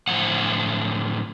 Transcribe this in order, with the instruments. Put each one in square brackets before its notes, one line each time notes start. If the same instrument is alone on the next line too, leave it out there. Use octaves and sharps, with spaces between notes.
[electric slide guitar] A2 D3 F3 A#3 F#5